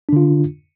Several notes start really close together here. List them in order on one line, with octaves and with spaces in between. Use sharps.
D4 D3 F4